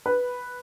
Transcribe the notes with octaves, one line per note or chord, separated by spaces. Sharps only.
B4